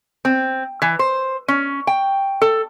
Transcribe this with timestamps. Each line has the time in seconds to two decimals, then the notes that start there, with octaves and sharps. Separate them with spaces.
0.25 C4
0.82 E3
0.99 C5
1.48 C#4
1.87 G5
2.42 A4